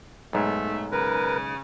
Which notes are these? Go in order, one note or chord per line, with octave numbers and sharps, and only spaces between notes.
B1 G#2 A3
C#3 A#4 B4